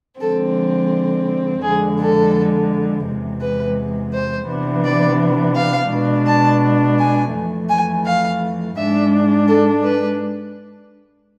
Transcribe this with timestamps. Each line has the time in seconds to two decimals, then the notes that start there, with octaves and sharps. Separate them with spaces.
0.20 D3 F3 G#3 C4 A4
1.63 F2 D3 G#3 G#4
1.98 A4
3.06 E2 C3 G#3
3.41 B4
4.13 C5
4.47 C3 E3 B3 D4
4.84 D5
5.55 F5
5.90 B2 G#3 D4
6.26 A5
6.98 G#5
7.33 F2 E3 A3
7.68 G#5
8.05 F5
8.76 G#2 G#3 D4 E5
9.47 A4
9.83 B4